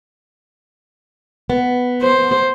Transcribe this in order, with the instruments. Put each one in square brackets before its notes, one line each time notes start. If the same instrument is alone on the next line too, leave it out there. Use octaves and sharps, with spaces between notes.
[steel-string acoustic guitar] B3
[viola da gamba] C5